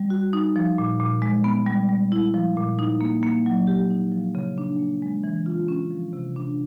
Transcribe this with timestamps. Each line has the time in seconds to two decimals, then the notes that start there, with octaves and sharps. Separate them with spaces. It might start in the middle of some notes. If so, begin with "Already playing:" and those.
Already playing: G3
0.10 F#4
0.33 D#4
0.56 F3
0.78 A#2
1.00 A#2
1.22 G#3
1.44 B3
1.67 G3
1.89 G3
2.12 E4
2.34 F3
2.57 A#2
2.79 D#4
3.01 A#3
3.23 A#3
3.46 F#3
3.67 G4
3.90 D#4
4.12 F3
4.35 C#3
4.58 D4
4.79 A#3
5.02 G#3
5.24 E3
5.46 F4
5.68 C#4
5.91 F3
6.13 C3
6.36 D4